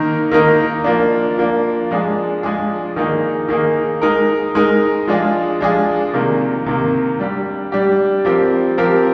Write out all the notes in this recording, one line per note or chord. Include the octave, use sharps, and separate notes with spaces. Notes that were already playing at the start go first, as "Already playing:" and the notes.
Already playing: D#3 A#3 D#4 A#4
D#3 A#3 D#4 A#4
F3 A#3 D4
F3 A#3 D4
F3 G#3 D4 G#4
F3 G#3 D4 G#4
D#3 A#3 D#4 G#4
D#3 A#3 D#4 G#4
G#3 D#4 A#4
G#3 D#4 A#4
F3 G#3 D4 F4 G#4
F3 G#3 D4 F4 G#4
C3 D#3 A#3
C3 D#3 A#3
G3 D4 G4
G3 D4 G4
F3 C4 G4 A#4
F3 C4 G4 A#4